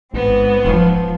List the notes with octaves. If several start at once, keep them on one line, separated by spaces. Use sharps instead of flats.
A1 G#2 B3 C4
E1 F3